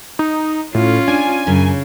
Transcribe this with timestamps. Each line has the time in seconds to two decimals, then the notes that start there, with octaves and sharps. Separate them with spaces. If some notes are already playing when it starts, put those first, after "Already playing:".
0.19 D#4
0.75 A2 C#4 F4
1.08 D4 G#5
1.47 F#2 C#3